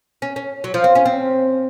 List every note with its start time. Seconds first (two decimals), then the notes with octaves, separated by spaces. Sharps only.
0.22 C#4
0.36 C#4
0.64 F#3
0.74 F3
0.84 C4
0.95 C#4
1.05 C4